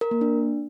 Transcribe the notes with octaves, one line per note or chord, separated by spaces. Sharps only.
A#4
A#3
D4